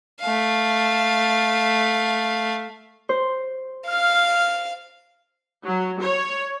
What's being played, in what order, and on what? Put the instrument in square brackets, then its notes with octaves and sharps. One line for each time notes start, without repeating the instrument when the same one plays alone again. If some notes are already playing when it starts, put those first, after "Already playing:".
[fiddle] A3 F5
[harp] C5
[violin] F5 [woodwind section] F6
[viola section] F#3
C#5